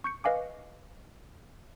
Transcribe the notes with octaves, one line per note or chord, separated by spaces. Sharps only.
C#6 G6 C#7
B4 D#5 F5 G#5 D6